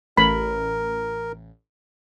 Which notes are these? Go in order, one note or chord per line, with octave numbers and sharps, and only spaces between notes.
A1 A#4 B5